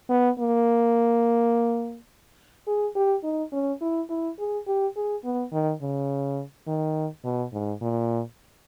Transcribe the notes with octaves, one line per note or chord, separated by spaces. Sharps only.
B3
A#3
G#4
G4
D#4
C#4
E4
E4
G#4
G4
G#4
B3
D#3
C#3
D#3
B2
G#2
A#2